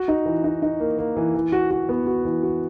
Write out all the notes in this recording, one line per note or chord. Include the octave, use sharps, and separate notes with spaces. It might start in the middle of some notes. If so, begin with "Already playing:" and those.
Already playing: F#4
D#4
E3
D#4
D#4
A#3
A#3
E3
E3
F#4
F#4
B3
F#4
E3
F#4